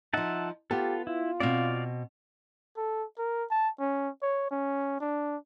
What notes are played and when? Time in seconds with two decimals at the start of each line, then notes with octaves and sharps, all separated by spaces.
0.14 F3 D#4 E5 F#5 A5
0.71 B3 F4 G4 A4
1.07 E4 F4
1.40 B2 C4 D5 F5
2.77 A4
3.18 A#4
3.51 A5
3.80 C#4
4.22 C#5
4.51 C#4
5.00 D4